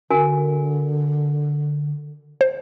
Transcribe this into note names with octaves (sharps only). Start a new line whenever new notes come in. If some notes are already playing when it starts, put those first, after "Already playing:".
D3 F#4 A#4 G#5
C5